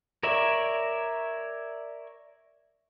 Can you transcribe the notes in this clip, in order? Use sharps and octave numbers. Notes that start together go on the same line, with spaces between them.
A#4 C#5 D5 E5